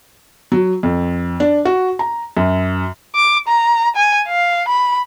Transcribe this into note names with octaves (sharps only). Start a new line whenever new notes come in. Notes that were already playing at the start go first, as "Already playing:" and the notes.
F#3
F2
D4
F#4
A#5
F#2
D6
A#5
G#5
F5
B5